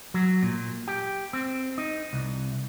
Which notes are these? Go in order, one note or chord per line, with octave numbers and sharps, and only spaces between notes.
F#3
A#2
G4
C4
D#4
C2